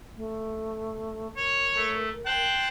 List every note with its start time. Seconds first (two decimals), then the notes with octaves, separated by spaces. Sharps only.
0.17 A3
1.37 A#4 C#5
1.76 A3
2.26 C5 G5 A5 F#6